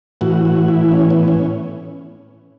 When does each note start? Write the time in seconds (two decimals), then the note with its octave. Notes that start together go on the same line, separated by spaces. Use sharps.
0.21 A2 E3 F#4
0.45 F#4
0.68 E4
0.92 C#4
1.10 B3
1.28 C#4